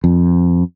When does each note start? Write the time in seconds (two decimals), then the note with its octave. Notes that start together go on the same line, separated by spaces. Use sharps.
0.04 F2